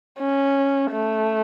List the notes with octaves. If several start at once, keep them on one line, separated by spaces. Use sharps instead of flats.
C#4
A3